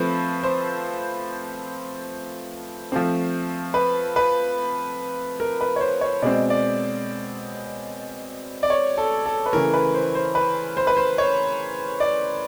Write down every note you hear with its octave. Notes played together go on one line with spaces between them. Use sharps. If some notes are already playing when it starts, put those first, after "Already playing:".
Already playing: F3 A3 C4 B4
C5
F3 A3 C4
B4
B4
A#4
B4
C#5
C5
C#5
B2 G#3 C4 D5
D5
D5
C#5
A4
A4
B4
C#3 E3 A3 A#4
B4
C5
C5
B4
C5
B4
C5
C#5
D5